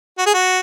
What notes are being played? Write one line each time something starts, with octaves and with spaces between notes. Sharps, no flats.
F#4
G#4
F#4